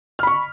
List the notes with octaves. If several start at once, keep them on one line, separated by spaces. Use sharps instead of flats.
B5 C#6 F6